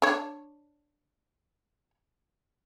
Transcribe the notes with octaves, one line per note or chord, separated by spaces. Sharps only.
D4 C#5